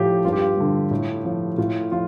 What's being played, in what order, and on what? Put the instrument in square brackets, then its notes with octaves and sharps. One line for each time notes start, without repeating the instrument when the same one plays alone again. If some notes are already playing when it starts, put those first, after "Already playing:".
Already playing: [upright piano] A2 F3 G4
G2 F4
G4
F4
D3 G3
A2
F3
A2 F4
F3 F4